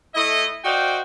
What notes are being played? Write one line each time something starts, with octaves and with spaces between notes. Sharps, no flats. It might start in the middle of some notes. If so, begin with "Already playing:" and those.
A3 E4 D#5
F#4 C5 D5 D#5 F5 G5